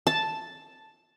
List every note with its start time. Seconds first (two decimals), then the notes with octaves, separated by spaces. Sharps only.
0.07 A5